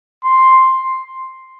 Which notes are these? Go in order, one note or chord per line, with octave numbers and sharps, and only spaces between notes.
C6